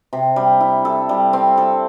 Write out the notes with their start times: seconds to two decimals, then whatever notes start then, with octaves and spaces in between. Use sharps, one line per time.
0.13 C3
0.36 G3
0.61 E4
0.85 A4
1.09 G3
1.33 C4
1.57 A4